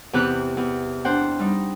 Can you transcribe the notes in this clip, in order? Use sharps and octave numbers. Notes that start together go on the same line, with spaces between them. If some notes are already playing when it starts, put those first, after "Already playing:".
E2 C3 E3 G4 F#6
E2
D4 C5 F#5 G5
G3 D#4